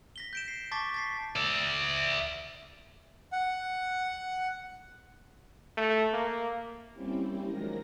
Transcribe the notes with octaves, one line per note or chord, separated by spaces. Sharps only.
A#6 B6 G7
G6 D7 E7
C7
A5 C#6 D6 A6 B6
A6 B6 C7
D5 E5
F#5
A3
A#3
G3 A#3 C4 C#4 E4 G4
D#3 F3 F#3 G#3 A#4 A#6